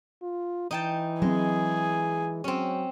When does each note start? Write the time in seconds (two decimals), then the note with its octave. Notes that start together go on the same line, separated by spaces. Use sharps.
0.22 F4
0.71 E3 D#4 G5 A5
1.22 F#3 G#3 C4 G#4
2.44 F#3 C4 C#4